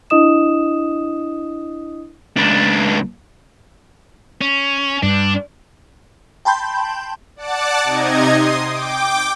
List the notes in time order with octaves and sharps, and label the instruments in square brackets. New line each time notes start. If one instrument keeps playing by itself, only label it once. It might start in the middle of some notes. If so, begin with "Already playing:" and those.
[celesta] D4 E4 D#5 D#6 E7
[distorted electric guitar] C#2 D4
[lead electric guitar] C#4
[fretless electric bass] G2 [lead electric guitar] D4
[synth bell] G5 A5 B5 C6 G6
[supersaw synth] D5 F#5 A5 D6
C3 D#4 D#5 G#6
C6 D#6
G5 D6